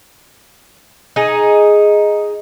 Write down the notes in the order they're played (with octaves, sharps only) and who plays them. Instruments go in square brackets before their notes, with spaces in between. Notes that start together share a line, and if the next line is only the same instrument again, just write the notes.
[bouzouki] D#4 G#4